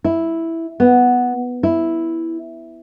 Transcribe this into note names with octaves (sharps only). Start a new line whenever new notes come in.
E4
B3
E4